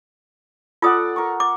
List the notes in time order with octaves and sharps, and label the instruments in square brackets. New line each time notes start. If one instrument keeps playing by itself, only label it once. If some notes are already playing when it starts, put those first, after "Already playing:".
[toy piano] F4 D#6 [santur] A4 D5 F#5
[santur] A#4 C#6
[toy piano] D6